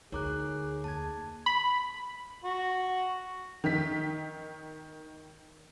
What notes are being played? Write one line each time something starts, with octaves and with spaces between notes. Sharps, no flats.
D2 D#4 G#4 A#4 C#5 A#5 D6 F#6
F2 A#3 A5 G#6
B5
F#4
D#3 B6